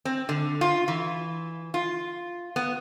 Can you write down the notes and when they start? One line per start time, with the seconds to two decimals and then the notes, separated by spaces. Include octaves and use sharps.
0.05 C4
0.29 D3
0.61 F4
0.88 E3
1.74 F4
2.56 B3